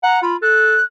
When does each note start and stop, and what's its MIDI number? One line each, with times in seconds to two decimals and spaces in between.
0.03 0.18 78
0.03 0.22 82
0.22 0.35 65
0.22 0.37 83
0.42 0.78 69
0.42 0.84 90